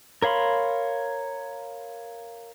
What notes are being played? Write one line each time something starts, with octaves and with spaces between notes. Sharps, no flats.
A#4 C#5 F5 B5 C6